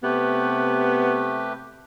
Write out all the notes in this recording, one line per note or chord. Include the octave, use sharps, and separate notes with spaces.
C3 A3 B3 G4 B4